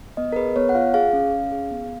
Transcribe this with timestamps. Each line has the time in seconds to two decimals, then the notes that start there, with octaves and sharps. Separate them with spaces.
0.17 B3 D#5
0.32 A#4
0.36 G#4 B4
0.56 B3 C#5
0.69 F#5
0.75 F4 F5
0.94 G#4 F5
1.13 C#4
1.33 C#4
1.52 G#4
1.71 B3